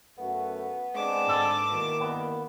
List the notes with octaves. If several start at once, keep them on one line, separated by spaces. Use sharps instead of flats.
F#2 A3 B3 F#4
G#3 C4 D4 D6 E7
G#2 A4 D5
B2 D#3 E3 A#3
G2 B3